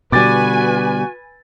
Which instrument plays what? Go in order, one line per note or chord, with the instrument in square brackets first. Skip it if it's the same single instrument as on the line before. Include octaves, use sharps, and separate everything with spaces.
[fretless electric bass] B2 D3 G3 [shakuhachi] F#4 [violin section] B4 G#5 [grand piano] D6 A6